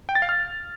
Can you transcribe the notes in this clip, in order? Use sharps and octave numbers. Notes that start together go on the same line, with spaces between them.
G5
A6
F5
F6